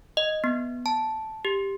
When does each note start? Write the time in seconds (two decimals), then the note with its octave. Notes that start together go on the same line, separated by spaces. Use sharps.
0.17 D#5
0.44 B3
0.86 A5
1.45 G4